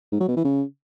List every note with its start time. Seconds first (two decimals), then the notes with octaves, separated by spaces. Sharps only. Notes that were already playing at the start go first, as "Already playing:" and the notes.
0.12 G#2
0.20 F#3
0.28 B2
0.36 E3
0.45 C#3